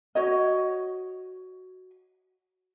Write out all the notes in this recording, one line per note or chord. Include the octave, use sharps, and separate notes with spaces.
F#4 C#5 D#5